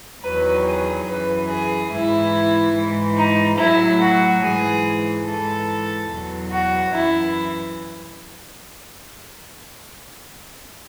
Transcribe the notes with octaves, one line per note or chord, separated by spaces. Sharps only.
E2 D#3 F#3 B4
G#4
F#2 E3 B4
G#4
G#2 E3 E4
G#2 E3
D#4
A2 F#3 E4
F#4
G#2 E3 G#4
G#2 E3 A4
E2 B2 F#3
F#4
F#2 E3 E4